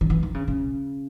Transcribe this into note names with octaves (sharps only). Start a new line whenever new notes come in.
D#3
E3
D#3
C#3
C#3